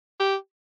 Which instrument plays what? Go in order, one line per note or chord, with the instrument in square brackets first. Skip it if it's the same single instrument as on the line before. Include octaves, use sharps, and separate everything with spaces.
[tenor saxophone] G4